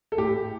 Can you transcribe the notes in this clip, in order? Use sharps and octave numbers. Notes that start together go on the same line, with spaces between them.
A4
A2 G4